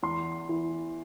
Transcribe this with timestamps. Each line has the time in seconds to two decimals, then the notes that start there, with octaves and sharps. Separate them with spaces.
0.03 E2 C6
0.49 E3